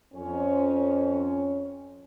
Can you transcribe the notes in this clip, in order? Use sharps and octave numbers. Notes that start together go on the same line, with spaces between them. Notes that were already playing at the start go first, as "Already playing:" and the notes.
F2 C#4